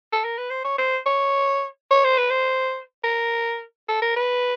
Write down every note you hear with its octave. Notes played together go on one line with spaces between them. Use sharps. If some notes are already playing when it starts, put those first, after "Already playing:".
A4
A#4
B4
C5
C#5
C5
C#5
C#5
C5
B4
C5
A#4
A4
A#4
B4